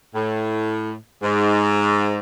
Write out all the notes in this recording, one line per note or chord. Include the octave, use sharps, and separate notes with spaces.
A2
G#2